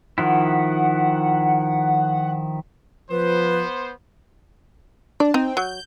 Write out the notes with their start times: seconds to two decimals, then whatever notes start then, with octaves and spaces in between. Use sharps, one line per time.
0.18 D#3 F3 E4 F#5
3.11 F3 B3 B4 C5
5.20 D4 D5
5.34 C4 D#4
5.57 F#3 G6